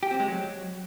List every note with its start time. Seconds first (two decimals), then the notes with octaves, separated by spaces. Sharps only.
0.03 G4
0.11 C4
0.20 G#3
0.28 F#3